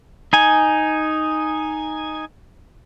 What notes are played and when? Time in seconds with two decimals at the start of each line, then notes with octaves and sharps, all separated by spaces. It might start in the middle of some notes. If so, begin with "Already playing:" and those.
0.33 D#4 G#5